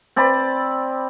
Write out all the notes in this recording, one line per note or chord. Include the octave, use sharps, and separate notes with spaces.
C4 D5 A5 B5